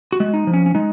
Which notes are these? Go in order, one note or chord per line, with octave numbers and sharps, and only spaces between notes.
F#4
G#3
D#4
F3
C#4
C#4
G#3 D#4